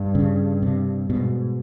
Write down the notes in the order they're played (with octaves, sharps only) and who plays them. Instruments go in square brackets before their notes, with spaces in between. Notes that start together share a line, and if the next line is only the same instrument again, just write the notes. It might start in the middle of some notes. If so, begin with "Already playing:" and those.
Already playing: [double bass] G2
[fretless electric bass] C#3
C3
[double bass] G#2 [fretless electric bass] B2